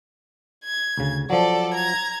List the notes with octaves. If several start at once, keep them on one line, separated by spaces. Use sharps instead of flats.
G#6
D2 C#3
F3 F#3 A4 D5
A#5 G#6